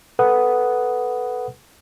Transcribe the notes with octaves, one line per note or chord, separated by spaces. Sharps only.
A4 B4 F#5 D#6